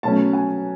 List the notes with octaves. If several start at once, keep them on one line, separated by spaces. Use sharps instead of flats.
B2 F#3 A3 C#4 A5
G#5